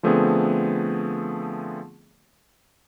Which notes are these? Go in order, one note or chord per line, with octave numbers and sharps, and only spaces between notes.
D3 F3 A3 B3 C4 G#4